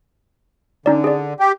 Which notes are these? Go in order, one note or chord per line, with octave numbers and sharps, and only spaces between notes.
D3 C#4 D#4 D5
G#4 D5
G4